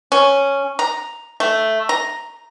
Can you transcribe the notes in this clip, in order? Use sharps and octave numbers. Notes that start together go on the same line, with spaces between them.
C#4
A#5
A3
A#5